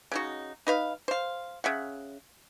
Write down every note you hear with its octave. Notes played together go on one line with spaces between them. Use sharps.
C#3 D#4 F#4
D#4 B4 F5
C5 F5
C#3 E5 F#5